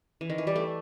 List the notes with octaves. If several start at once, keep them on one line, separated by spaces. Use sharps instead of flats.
E3
D#3
E3
G3
A3